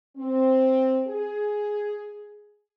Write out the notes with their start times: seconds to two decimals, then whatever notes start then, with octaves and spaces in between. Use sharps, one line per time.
0.17 C4
1.07 G#4